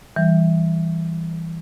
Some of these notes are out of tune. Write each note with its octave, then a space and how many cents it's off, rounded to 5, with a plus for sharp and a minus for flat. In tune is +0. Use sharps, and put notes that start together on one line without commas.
E3 +0 G3 +0